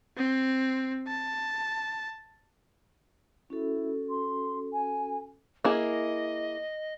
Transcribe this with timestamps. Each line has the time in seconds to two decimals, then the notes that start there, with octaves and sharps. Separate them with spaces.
0.17 C4
1.07 A5
3.50 C#4 E4 F#4 A4
4.09 C6
4.73 G#5
5.64 A#3 E4 G#4 D#5